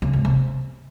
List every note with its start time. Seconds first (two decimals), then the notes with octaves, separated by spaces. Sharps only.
0.02 C#3
0.13 G#2
0.25 C3